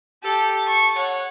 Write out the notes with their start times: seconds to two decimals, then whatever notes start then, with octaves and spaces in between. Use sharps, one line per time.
0.23 G4 A4
0.67 A5 C#6
0.96 C#5 F#5